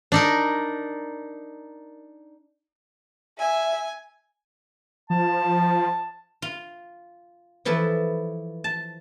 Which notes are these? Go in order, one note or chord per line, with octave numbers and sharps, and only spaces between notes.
D4 D#4 A#4
E5 G#5
F3 A5
F4
E3 F3 E4 A4 B4
A5